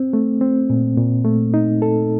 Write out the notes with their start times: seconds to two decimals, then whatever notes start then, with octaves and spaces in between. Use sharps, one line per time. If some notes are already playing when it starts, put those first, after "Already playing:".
Already playing: C4
0.13 A3
0.41 C4
0.70 A#2
0.97 A#2
1.25 A3
1.54 D#4
1.82 A4